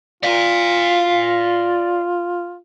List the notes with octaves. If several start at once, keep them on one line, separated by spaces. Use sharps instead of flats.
F4 D5 F5